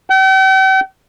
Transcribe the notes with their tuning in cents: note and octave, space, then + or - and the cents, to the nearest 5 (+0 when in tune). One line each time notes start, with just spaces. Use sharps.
G5 -45